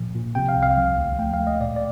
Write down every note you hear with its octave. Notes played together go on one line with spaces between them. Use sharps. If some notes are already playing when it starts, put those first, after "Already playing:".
Already playing: A#2 F3
A#2
C3 G5
F5
C2
F5
F3
D2
A3 G5
F5
A3
D#5
A#2 D5
D5